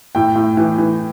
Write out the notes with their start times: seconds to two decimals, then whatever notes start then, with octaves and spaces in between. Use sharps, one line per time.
0.15 A2 G5
0.35 A2
0.57 E3
0.78 E3